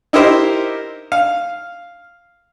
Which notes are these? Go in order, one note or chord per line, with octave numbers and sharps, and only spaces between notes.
D#4 E4 G4 A#4 C5
F5